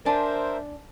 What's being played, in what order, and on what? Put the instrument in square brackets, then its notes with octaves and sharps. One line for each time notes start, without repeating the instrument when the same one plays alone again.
[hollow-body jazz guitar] D4 [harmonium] A#4 C5 E5 [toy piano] G#5 A5